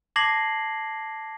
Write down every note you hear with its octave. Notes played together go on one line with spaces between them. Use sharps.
A5 D6 G#6 A#6 C7 F#7